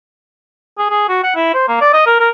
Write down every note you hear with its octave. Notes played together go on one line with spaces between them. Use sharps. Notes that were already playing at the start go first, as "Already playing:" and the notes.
G#4
G#4
F#4
F#5
E4
C5
A#3
D5
D#5
A#4
A#4